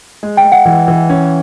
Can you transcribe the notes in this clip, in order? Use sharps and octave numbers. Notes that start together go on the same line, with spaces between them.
G#3
G5
G#3
F#5
E3
E3
C#4